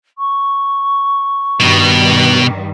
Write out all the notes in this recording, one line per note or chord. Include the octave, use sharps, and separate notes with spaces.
C#6
G2 B2 D#3 G3